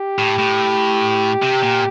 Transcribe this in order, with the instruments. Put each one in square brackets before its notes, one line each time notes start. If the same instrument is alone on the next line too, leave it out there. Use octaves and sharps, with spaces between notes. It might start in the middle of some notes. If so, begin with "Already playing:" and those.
Already playing: [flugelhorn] G4
[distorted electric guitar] A2
A2
C3
A#2